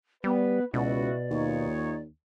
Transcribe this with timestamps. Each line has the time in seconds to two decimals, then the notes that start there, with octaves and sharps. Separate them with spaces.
0.24 G3 B3 B4
0.74 C#2 B2 E4 F#4 D5
1.31 D#2 D#4 F4 C#5